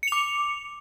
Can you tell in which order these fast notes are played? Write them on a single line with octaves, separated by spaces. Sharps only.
C#7 F7 D6